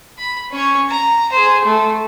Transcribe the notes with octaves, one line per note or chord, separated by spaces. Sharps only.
B5
C#4 C#5
A#5
G#4 C5
A3